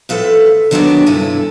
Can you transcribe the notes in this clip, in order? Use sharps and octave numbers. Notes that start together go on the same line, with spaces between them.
A2 F3 A4 B4
D3 D#3 F#3 A#3 B3 D4
G2 C3 E4 A4 G#5